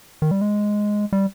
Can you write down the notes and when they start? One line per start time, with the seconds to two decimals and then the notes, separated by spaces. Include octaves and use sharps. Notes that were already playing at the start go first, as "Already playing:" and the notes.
0.22 D#3
0.31 G3
0.41 G#3
1.13 G3